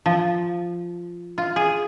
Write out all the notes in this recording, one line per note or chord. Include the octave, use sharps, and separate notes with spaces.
F3
F4
G#4